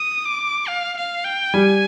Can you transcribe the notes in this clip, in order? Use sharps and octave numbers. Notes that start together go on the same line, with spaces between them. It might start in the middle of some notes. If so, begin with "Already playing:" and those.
Already playing: D#6
D6
F5
F5
G5
G3 G#5